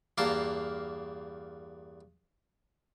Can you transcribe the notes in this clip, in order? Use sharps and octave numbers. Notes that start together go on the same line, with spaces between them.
E2 G2 A#3 A#4 F5 A5